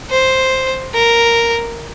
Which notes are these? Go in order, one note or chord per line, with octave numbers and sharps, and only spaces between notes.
C5
A#4